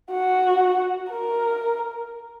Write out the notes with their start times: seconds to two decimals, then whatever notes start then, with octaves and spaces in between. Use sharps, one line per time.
0.11 F#4
1.10 A#4